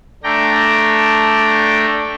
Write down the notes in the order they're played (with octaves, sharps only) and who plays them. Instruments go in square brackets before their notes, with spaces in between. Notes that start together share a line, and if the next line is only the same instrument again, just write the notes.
[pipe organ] A3 D4 G5 A#5